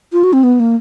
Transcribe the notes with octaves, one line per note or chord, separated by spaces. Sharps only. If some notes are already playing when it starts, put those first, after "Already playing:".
F4
F#4
C4
B3
A#3